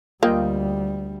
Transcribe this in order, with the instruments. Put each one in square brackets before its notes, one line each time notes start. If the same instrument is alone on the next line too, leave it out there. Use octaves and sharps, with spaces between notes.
[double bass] D2 G3 [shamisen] A#3 [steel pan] F4 D#5 G5